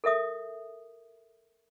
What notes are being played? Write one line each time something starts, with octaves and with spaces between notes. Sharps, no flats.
A4 A#4 E5 D#6